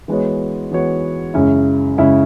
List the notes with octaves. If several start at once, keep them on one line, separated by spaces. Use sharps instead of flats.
E3 G#3 B3 F#4 C#5
E3 G#3 B3 F#4 C#5
F#2 C#3 G#3 C#4 E4
F#2 C#3 G#3 C#4 E4